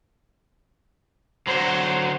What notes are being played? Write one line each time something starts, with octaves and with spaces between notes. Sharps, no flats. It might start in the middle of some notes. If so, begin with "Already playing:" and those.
D3 F#3 C5